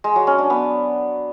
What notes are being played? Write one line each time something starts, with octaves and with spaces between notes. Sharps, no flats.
G#3
F#3
C#4
D4
B3